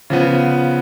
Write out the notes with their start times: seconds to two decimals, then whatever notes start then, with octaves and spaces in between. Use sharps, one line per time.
0.10 C#3 F3 B3